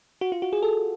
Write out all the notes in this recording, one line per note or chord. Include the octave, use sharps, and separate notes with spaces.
F#4
F4
F#4
G#4
A4